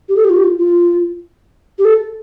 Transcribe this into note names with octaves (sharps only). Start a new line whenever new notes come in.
G4
A4
G4
F4
G4
F4
F4
G4
A4